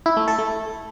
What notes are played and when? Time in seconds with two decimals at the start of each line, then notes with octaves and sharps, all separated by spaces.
0.06 E4
0.17 A3
0.28 A4
0.39 A3